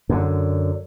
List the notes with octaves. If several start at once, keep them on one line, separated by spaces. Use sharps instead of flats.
F#2 D3